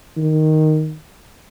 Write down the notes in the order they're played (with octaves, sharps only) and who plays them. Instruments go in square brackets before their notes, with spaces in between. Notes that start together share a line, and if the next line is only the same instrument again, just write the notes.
[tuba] D#3